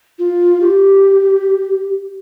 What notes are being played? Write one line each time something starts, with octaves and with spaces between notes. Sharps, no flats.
F4
G4